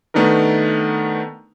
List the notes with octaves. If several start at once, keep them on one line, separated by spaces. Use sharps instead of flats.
D#3 A3 B3 D4 D#4 A#4